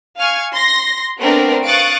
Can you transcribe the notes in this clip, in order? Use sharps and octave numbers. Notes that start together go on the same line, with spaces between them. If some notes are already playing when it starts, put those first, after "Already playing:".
F5 G#5 C#6 F6 G#6
C6 A#6
A3 B3 C4 D4 A#4
F5 C#6 D#6 F#6 A6 D7